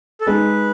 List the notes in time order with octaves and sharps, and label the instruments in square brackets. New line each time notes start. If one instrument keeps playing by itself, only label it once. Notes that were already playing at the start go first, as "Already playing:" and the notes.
[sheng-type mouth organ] A4
[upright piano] G#3 D#4 G#4 [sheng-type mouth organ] B4